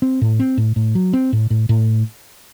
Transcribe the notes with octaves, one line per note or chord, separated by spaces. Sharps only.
C4
A2
C4
A2
A2
F#3
C4
A2
A2
A2